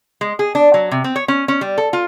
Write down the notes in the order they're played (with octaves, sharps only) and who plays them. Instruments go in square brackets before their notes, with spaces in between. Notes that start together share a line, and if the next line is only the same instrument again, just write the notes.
[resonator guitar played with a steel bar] G#3
G#4
D4
F#3
C3
C4
C#5
C#4
C#4
G3
A4
F4